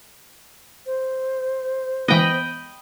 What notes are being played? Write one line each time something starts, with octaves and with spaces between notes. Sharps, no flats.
C5
E3 G#3 B3 D#5 G5 B5